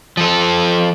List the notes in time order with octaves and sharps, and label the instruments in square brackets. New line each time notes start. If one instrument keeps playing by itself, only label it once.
[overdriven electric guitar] F3 A4